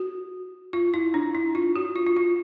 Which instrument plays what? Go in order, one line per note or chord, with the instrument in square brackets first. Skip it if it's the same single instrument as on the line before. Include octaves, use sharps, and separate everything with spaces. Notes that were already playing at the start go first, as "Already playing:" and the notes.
Already playing: [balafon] F#4
F4
E4
D4
E4
F4
F#4
F4
F4
F4